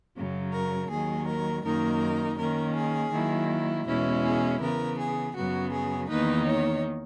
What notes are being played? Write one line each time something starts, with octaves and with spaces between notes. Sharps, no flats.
F#2 C#3 F#3
A#4
D#2 D#3 F#3 G#4
A#4
F#2 D#3 A#3 D#4 A#4
D#3 A#3 C#4 A#4
G#4
D#3 F#3 A#3 E4
E2 B2 G#3 C#4 E4
G#4
C#3 E3 B3 A#4
G#4
F#2 C#3 F#3 B3 F#4
G#4
E2 D#3 A#3 D#4 B4
C#5